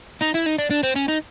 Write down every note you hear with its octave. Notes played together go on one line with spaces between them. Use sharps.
D#4
E4
D#4
D4
D4
C4
C#4
D#4